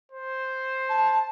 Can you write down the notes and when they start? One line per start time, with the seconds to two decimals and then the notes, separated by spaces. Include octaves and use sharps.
0.12 C5
0.89 A5